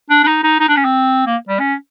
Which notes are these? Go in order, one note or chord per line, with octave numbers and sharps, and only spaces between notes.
D4
D4
D#4
D#4
D#4
D4
C#4
C4
A#3
G3
C#4